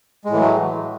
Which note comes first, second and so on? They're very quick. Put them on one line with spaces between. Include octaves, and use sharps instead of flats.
G#3 A2 E3 F#3 A3